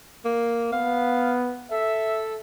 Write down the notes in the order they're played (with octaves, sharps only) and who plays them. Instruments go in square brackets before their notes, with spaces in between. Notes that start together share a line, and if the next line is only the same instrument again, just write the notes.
[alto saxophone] A#3
[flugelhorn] B3 [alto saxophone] F5
[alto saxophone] A4 [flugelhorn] E5